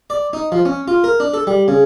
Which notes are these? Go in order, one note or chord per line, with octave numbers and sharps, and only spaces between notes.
D5
D#4
F3
C#4
F4
A#4
D4
A4
G3
C#3